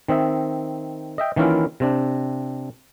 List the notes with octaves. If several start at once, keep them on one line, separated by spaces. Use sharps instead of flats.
D#3 C4 D#5 E5
D#5 E5 G5
D#3 E3 A#3 C#4 E4 F4
C3 C4 D4